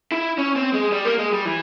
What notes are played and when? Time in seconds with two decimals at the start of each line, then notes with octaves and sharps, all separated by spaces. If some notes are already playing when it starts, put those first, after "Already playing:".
0.12 E4
0.38 C#4
0.56 C4
0.74 G#3
0.92 G3
1.05 A#3
1.18 G#3
1.33 G3
1.45 E3